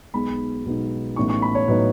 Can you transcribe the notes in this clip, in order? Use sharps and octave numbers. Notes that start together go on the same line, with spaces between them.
B1 B2 G#3 B3 D#4 B5
B1 B2 G#3 B3 D#4
A1 A2 F#3 B3 D#4 C#6
C#6
B5
C#5
A2 F#3 B3 D#4 B4